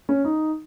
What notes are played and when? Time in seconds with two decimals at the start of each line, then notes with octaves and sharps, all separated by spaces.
0.09 C#4
0.25 D#4